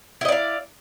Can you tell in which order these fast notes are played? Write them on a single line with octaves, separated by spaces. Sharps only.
E4 D#5 D5 F5